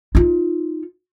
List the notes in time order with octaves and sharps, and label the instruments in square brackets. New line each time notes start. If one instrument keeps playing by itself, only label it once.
[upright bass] D#4 F4